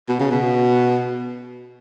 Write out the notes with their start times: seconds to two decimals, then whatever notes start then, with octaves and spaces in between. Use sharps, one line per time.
0.09 B2
0.20 C#3
0.31 B2